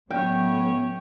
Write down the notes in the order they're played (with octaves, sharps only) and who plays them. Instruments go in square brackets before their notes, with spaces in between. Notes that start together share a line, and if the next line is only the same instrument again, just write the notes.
[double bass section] A2 F#3 A3 [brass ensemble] B3 [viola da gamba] C#4 C#5 [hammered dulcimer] G5